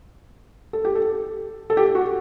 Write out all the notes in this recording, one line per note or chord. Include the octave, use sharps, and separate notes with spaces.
A4
G4
A4
A4
G4
F#4